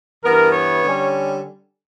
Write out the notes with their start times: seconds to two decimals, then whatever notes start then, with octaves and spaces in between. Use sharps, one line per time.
0.23 G2 E3 B3 A#4
0.53 C#5
0.84 D3 G3 C#4